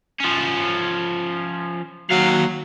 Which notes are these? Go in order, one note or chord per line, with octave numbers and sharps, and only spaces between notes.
F3 C#4
D#2 F#3 F5